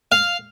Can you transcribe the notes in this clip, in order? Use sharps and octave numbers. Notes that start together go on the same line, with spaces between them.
F5